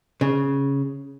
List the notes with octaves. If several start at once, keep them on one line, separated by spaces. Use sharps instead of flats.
C#3